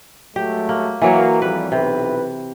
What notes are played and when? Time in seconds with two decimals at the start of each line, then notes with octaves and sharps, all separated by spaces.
0.36 F#3 G#3 A3 G4
0.69 A#3
1.02 E3 F#3 A#3 C#5
1.42 F2 G3 B4
1.72 B1 C3 E4 B4